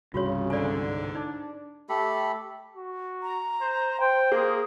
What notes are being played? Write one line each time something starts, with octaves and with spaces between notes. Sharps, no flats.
C2 G2 C#3 F4 F#4 C#5
G#2 D3 D5 G#5
D4 D#4
A3 G4 A4 B5
F#4
A#5
C5
C5 G5
A#3 G#4